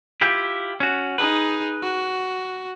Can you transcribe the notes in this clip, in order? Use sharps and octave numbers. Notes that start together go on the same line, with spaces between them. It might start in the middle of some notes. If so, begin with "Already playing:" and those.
E4 F4 G4
C#4 F#4
D#4 G#4 B4
F#4